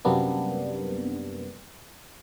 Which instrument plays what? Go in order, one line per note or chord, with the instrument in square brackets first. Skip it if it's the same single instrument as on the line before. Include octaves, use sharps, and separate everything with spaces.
[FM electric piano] F#2 C3 G3 A#3 B3 D4